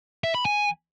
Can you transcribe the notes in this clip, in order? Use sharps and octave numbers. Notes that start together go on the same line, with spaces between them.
E5
B5
G#5